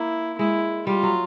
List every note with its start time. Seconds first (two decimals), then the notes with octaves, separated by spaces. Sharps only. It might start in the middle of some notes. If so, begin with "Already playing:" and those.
Already playing: A#3 E4
0.38 G#3 E4
0.87 G3 F4
1.03 F#3